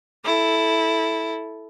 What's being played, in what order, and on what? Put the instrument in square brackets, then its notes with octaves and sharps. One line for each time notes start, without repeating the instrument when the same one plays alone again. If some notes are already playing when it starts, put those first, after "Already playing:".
[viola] E4 A4